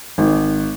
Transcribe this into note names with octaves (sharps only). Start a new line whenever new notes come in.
G#1